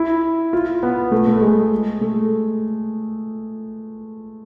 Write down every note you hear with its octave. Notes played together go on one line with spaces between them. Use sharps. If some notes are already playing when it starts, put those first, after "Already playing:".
Already playing: E4
F4
B3
A3
A3
G#3
A3